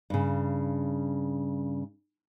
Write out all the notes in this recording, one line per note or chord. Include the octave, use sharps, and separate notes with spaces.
G2 C#3